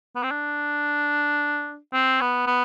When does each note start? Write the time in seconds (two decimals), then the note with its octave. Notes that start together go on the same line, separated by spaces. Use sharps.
0.16 B3
0.23 C4
0.31 D4
1.93 C4
2.21 B3
2.47 B3